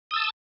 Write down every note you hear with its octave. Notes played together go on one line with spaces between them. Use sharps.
A5 D#6 E6